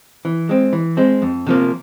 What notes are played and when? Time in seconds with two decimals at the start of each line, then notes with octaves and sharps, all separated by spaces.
0.25 E3
0.49 G#3 C4
0.73 E3
0.97 G#3 C4
1.22 F2
1.47 C3 F3 A#3